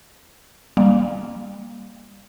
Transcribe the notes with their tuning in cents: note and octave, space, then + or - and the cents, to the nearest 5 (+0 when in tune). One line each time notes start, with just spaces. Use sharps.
G3 +25 A#3 +5